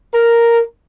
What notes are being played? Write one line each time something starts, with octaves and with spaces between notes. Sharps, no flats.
A#4